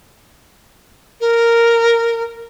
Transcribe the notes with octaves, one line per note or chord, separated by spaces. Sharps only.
A#4